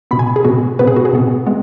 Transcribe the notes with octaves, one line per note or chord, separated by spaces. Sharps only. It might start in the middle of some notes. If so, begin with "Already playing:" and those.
B2 B3 B5
G#5
G#4
B2 B3 F#4
B2 B3 B4
G#4
F#4
G#4
B2 B3
G#3 B3